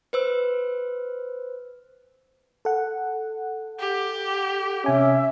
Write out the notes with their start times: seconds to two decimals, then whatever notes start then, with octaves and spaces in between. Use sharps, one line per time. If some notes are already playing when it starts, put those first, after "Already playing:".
0.13 B4 C5 E6
2.65 A4 F#5
3.80 G4
4.84 C3 C#4 E5 G#5 D6